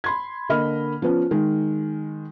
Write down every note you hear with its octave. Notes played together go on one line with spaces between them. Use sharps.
B5 C6 G#6
D3 A#3 D#5 B5 F6
F3 B3 C#4
D#3 G#3